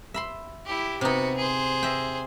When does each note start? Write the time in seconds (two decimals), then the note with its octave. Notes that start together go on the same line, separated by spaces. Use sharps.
0.14 E5 B5 C6
0.66 E4 G4
1.01 C3 B3 D#4 F#4
1.37 G#4 C5
1.83 D#5 E5 G5